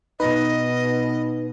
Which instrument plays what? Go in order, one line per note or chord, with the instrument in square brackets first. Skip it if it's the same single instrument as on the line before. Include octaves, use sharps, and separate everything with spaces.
[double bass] B2 [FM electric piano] D#4 B4 [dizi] D#5